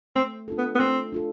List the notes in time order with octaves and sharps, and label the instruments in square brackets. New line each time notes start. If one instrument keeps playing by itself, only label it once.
[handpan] A3 [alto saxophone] C4
[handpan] D4 F4 A4
[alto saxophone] B3
B3
[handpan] A3 [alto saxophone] C4
[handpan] D4 F4 A4